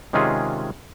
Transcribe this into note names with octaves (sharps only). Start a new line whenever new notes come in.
C3 D#3 G#3 C#4 F4 G#4